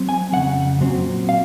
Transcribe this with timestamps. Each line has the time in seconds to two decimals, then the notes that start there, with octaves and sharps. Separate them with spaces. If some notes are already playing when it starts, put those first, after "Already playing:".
Already playing: F#3 C4
0.09 G#5
0.33 F2 C#3 F#3 F#5
0.80 A#2 F#3 C4
1.29 F5